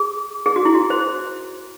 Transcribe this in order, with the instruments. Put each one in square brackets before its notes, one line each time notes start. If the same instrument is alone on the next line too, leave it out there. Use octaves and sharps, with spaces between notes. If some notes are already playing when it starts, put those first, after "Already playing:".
Already playing: [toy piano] G#4
G#4
F#4
E4
F#4
C5